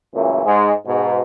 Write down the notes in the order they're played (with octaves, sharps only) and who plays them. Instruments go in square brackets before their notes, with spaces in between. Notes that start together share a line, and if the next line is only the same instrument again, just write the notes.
[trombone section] C#2 F#2 A#2 E3 A3
G#2 G#3
G#2 B2